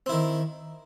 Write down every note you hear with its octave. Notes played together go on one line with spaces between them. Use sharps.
D#3 C4 E4